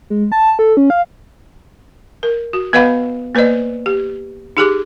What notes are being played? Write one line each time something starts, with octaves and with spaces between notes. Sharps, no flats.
G#3
A5
A4
C#4
F5
A#4
F#4
B3 B4 D#5 F5 F#5 B5
A#3 B4 C5 D5 D#5
G4
D#4 G4 G#4 D6